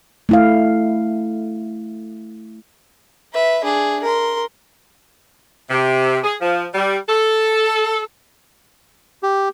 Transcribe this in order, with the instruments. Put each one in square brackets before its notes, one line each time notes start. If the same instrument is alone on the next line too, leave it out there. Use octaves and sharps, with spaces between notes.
[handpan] A3 E4 F5
[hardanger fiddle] B4 E5
D4 G#4
A#4 C6
[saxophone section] C3
G#4
F3
G3
A4
[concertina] G4